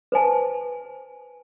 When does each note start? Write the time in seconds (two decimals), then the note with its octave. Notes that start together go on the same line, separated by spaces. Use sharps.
0.12 B4 C5 G#5 A5